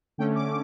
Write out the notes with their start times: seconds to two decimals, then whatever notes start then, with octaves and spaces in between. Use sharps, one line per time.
0.18 D3 A3 C#4 G5
0.35 D6